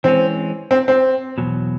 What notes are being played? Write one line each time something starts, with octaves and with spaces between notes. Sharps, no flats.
E3 G#3 C4 C#4
C4
C4
E2 B2 F#3